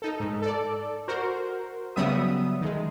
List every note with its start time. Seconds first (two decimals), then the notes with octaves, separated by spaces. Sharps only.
0.02 D#4 A4
0.20 G#2
0.42 A4 D5
1.08 F#4 A#4 C5
1.96 C#3 F#3 G3 B3 E5 D#6
2.61 D#3 G#3